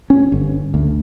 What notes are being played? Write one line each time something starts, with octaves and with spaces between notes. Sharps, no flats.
C#4
G1
D2